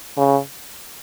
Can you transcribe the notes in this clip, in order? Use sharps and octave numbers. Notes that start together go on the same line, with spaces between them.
C#3